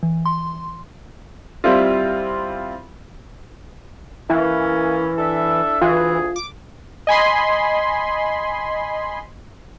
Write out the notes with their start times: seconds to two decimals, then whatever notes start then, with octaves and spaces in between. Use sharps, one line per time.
0.03 E3
0.26 C6
1.64 G3 C4 E4 F4
4.30 E3 A#3 C#4 E4
5.18 D4 A4 E5
5.82 D2 E3 F4 G#4
6.36 D6
7.07 D#5 G#5 B5 C6